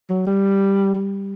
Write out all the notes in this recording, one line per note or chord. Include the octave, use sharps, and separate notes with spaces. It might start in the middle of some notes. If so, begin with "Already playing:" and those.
F#3
G3
G3